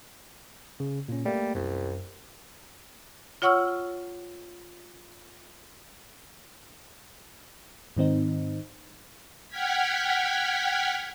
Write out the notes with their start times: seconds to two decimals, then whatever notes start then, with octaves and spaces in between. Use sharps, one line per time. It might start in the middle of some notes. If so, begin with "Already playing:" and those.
0.80 C#3
1.09 A#2 C#4
1.25 G3 A3 A#3
1.55 C2 F#2
3.42 F4 C#5 F#5 C#6 E6 F6
7.97 G#2 D#3 C4 D#4
9.49 F#5 G5 F6 G#6 B6